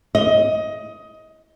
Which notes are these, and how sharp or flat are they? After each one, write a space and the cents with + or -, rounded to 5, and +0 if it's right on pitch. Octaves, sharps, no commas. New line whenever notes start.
D#5 +15